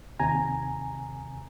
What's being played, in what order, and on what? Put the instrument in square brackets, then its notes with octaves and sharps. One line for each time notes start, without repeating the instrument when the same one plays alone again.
[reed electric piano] D#2 C3 G#5 A#5